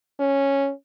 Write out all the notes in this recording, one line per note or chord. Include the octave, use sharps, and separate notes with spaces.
C#4